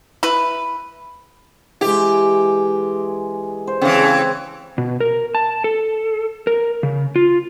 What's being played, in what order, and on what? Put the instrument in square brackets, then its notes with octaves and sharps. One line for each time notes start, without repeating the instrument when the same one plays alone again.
[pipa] E4 B4
[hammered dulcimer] E3 G#3 [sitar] G4
[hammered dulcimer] C5
[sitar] C#3 E3 [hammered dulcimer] C4
[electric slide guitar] B2
A#4
A5
A4
A#4
C#3
F4